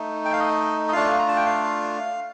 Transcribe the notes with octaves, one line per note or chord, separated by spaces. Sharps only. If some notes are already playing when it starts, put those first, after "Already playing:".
Already playing: A3 D#4
G5
F5
D#5
D#5
A3 D4 F4 F5
A#5
A5
G5
F5